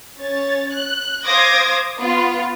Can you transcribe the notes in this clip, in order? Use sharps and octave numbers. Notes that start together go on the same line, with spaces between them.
C#4 C#5 A6
F#6
C5 F5 D6 D#6 G#6 A#6
B3 F4